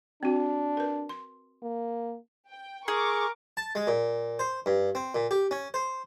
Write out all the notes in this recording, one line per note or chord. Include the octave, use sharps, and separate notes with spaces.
C4 D4 F#4
A#4 B4
C6
A#3
G5
G#4 A#4 C#6 D6
A5
G#3
A#2
C5
G2
C4
A#2
G4
C#4
C5